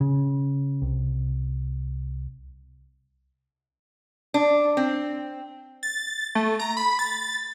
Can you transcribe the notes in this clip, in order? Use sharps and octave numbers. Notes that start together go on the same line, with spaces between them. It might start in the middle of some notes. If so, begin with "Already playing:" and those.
C#3
C2
D4
C4
A6
A3
A#5
B5
A6